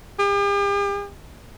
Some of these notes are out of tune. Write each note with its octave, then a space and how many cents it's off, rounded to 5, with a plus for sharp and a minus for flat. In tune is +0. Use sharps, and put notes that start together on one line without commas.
G4 +45